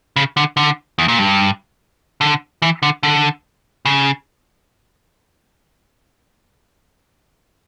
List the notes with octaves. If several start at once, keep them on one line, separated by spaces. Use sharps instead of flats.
C#3
D3
D3
E2
A#2
G2
D3
E3
D3
D3
C#3